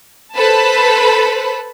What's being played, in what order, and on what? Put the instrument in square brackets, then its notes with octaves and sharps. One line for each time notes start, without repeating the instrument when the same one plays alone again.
[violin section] A4 B4 C5 A5 B5